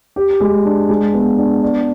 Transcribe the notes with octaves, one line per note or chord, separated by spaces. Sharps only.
G4
G#3
D4
G#3
B3
D4
D5